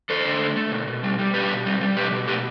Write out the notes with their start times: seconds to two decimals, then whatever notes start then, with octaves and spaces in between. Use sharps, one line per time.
0.10 D3 A4 C5
0.25 D3
0.40 A3
0.57 A3
0.72 B2
0.87 B2
1.03 G3
1.19 G3
1.34 B2 G4 B4
1.50 B2
1.66 G3
1.81 G3
1.96 B2 G4 B4
2.12 B2
2.27 A3 G4 B4